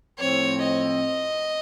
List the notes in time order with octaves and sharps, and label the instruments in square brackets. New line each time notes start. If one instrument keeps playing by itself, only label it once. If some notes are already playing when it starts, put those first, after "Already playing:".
[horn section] A2 F3 C4 [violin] C#5
[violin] D#5